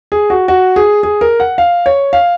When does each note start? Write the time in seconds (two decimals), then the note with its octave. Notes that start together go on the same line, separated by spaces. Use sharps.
0.12 G#4
0.30 F#4
0.48 F#4
0.76 G#4
1.03 G#4
1.21 A#4
1.40 F#5
1.58 F5
1.86 C#5
2.13 F5